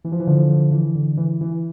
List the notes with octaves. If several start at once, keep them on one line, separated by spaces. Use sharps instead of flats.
E3
F3
E3
D3 F3
D3 F3
E3
D3
E3
E3